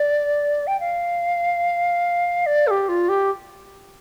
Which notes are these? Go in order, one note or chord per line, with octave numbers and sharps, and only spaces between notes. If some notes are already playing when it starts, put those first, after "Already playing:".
Already playing: D5
G5
F5
D5
A4
G4
F4
G4